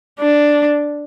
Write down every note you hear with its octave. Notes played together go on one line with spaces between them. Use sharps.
D4